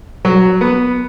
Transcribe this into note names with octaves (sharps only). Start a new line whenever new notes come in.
F#3
B3